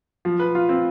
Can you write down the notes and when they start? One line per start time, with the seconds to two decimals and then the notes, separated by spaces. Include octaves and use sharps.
0.25 F3
0.39 B4
0.55 F4
0.69 C4